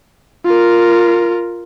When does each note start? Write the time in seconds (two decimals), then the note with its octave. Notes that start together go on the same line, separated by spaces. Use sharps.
0.45 F4 A#4